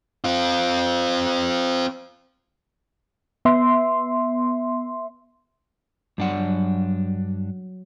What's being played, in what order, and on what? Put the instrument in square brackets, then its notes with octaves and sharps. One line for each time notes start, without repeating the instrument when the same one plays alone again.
[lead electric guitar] C4 F4
[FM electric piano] B3 E5 C6
[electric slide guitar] G2 D4 F#5 [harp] F#3